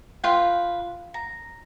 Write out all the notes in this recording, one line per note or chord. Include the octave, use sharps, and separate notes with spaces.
F4 B4 G5
A#5